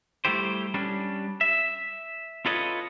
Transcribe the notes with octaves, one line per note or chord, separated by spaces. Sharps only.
G3 A3 E4 G4 C5
G3 C#4 D4
E5
F4 A4 B4 C#5 D#5